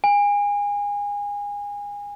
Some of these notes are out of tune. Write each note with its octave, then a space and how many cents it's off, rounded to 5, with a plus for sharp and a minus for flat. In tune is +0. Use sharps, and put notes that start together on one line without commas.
G#5 -30